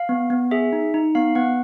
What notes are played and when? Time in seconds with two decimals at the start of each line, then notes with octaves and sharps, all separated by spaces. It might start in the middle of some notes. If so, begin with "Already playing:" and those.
Already playing: F5
0.09 B3
0.30 B3
0.51 G#4 E5
0.73 D#4
0.94 D#4
1.15 B3 F5
1.35 B3 F#5